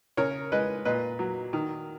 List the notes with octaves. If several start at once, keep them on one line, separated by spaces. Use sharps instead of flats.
C#3 A#4 C#5
G#3 B4 D#5
A#2 B4 D#5
F#3
D#3